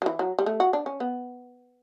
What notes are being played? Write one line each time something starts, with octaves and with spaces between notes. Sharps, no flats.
F#3
E3
F#3
G3
A3
F#4
D4
C#4
B3